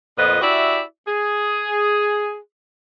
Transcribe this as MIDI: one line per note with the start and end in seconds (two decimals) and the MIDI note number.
0.17 0.40 41
0.17 0.40 46
0.17 0.40 59
0.17 0.40 71
0.17 0.40 75
0.42 0.81 64
0.42 0.81 66
0.42 0.81 67
0.42 0.81 74
0.42 0.81 76
1.06 2.37 68